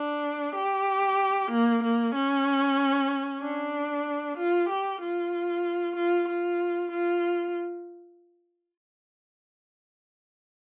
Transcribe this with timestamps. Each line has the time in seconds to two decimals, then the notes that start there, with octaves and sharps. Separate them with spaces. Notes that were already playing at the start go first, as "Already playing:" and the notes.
Already playing: D4
0.55 G4
1.51 A#3
1.83 A#3
2.15 C#4
3.42 D4
4.38 F4
4.69 G4
5.01 F4
5.96 F4
6.28 F4
6.91 F4